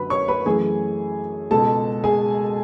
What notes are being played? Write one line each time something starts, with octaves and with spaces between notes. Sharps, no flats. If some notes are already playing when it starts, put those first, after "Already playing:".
Already playing: F#2 D3 F#3 B4 B5
C#5 C#6
B4 B5
F#2 E3 A3 G#4 G#5
C#2 B2 G#3 A4 A5
G#4 G#5